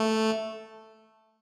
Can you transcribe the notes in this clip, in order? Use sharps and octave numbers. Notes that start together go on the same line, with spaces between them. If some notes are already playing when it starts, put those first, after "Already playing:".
Already playing: A3